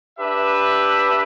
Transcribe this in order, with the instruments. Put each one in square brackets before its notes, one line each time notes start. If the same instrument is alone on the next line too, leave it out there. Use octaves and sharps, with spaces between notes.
[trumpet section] D4 G4 B4 E5